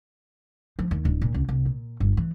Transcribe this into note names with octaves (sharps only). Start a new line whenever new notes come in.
F3
D#2
D1
A#2
C#2
C2
A#2
G1
E3